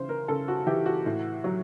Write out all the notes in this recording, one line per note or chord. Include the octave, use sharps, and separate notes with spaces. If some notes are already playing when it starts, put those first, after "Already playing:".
Already playing: C#3 E3 C5
A#4
C#3 A4
F#4
E3 G4
F#4
A2
F#3